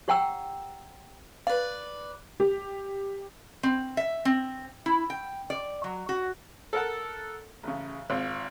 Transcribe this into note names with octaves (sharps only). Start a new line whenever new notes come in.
G4 C#5 F#5 G5 A#5 E6
B4 D5 F5
G4
C4
E5
C4
E4
G5
D5
F#3
F#4
A4 A#4 F#5 A5
A1 C#3
G#1 C4 F4